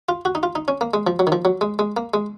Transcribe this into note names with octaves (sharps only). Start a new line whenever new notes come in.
F4
F#4
D#4
F4
D#4
C#4
A#3
G#3
F3
F#3
D#3
F3
F#3
G#3
G#3
A#3
G#3